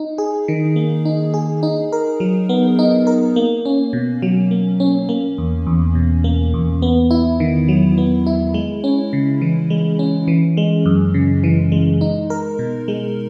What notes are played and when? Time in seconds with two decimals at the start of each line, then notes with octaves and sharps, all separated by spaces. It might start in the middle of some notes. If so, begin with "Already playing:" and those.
Already playing: D#4
0.18 G#4
0.48 D#3
0.76 A#3
1.05 D#4
1.34 G#4
1.63 D#4
1.93 A#4
2.20 F#3
2.49 B3
2.79 D#4
3.07 A#4
3.36 A#3
3.65 C#4
3.93 B2
4.22 F#3
4.51 A#3
4.80 C#4
5.09 A#3
5.38 E2
5.67 E2
5.95 B2
6.24 A#3
6.54 E2
6.82 B3
7.11 E4
7.40 D#3
7.68 F#3
7.98 B3
8.26 E4
8.54 G#3
8.84 C#4
9.13 C#3
9.41 E3
9.70 G#3
9.99 C#4
10.28 E3
10.57 G#3
10.86 F#2
11.14 C#3
11.44 E3
11.72 G#3
12.01 D#4
12.30 A#4
12.59 B2
12.88 G#3